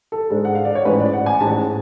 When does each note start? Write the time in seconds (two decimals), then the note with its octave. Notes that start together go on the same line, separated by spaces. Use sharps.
0.12 A4
0.30 G#2 G#3 D4
0.45 F#5
0.55 F5
0.65 D5
0.75 C#5
0.85 A1 G#2 G#3 C#4 B4
0.99 D5
1.13 F#5
1.26 G#5
1.40 A1 G#2 G#3 C#4 A5